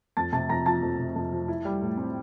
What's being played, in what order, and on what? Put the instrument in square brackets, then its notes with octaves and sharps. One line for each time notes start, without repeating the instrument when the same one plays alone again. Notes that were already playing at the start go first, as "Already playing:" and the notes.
[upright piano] F2 A5 A6
C3 A5 A6
F2 A#5 A#6
F3 A5 A6
F2
C3
F2
F3
E4
G3
A2
C4